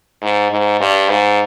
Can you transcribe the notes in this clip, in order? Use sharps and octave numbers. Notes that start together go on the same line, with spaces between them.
G#2
G#2
G2
G#2